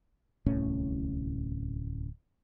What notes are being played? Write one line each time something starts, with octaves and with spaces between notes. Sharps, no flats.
D1 C2 A2 C#4